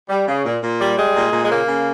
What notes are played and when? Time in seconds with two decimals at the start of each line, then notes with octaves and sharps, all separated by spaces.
0.10 G3
0.27 C#3
0.45 A#2
0.62 A#2
0.80 G3
0.97 G3 G#3
1.15 A#2
1.33 A#2
1.43 G#3
1.49 C#3 A#3
1.67 C#3